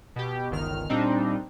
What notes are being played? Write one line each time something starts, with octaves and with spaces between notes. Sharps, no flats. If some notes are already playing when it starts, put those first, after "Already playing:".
B2 G4
G1 C#2 D#3 F6
A#2 G3 C4 D4 D#4